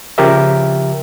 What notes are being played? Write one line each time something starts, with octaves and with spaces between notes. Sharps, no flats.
C#3 F3 G4 A#4 E5